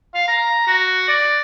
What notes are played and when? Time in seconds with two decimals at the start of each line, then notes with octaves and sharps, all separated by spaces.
0.14 F5
0.28 A#5
0.67 F#4
1.08 D5